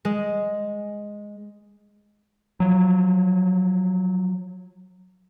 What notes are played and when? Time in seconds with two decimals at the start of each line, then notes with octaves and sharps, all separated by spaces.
0.05 G#3
2.60 F3 F#3